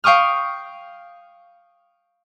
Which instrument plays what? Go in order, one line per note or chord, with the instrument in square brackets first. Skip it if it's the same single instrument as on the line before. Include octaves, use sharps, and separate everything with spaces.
[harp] F5 G5 C#6 D#6 F6